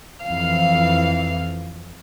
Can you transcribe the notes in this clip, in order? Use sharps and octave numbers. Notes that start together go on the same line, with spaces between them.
F2 E3 F5